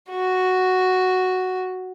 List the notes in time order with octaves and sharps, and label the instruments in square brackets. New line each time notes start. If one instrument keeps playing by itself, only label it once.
[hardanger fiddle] F#4